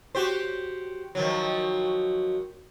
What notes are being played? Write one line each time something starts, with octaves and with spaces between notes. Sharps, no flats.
F#4 G4 C5
D#3 F3 F#3